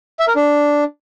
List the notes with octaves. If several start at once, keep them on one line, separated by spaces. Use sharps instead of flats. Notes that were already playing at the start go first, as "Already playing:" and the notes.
E5
A#4
D4